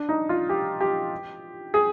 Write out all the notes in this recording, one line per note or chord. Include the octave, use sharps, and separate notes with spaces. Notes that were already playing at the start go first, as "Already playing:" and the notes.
Already playing: D4
D#4
F4
G4
G4
G#4